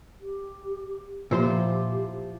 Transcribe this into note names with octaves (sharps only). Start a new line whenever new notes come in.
G4
A#2 F3 E4 G4 C5 C6